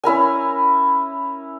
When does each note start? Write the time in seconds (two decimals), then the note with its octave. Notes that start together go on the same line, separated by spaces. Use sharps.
0.04 C#4 E4 A#4 G#5